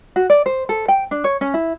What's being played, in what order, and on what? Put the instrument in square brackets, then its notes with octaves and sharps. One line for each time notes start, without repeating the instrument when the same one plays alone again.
[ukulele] F#4
D5
C5
A4
G5
D4
C#5
C#4
E4